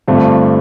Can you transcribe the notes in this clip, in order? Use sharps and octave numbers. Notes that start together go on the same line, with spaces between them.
G2 D3 A3 C4 F4